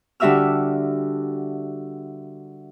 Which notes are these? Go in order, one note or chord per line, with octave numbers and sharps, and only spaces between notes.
D3 G3 F#4 E5 E6 F6